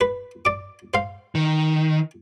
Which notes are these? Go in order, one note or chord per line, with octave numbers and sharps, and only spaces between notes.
B4
D5 D6
C5 F5
D#3